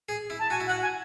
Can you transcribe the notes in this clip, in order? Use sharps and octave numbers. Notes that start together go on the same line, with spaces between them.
G#4
E4
A5
F#4 G#5
E4
F#5
F#4
G#5